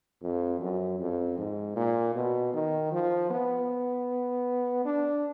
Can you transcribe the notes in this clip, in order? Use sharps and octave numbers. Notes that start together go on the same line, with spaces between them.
F2
F#2
F2
G#2
A#2
B2
D#3
F3
B3
D4